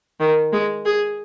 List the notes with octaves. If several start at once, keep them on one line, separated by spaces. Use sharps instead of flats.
D#3
G#3
G#4